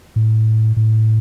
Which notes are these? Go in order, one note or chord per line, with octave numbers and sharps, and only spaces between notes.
A2
A2